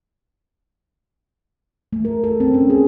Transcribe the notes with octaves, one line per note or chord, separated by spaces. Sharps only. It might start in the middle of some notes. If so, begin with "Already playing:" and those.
A3
A#4
A4
C4
C#4
G#4